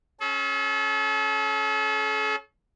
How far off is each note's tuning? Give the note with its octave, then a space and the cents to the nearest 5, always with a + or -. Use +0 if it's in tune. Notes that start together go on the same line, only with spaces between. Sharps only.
C#4 +0 A4 -40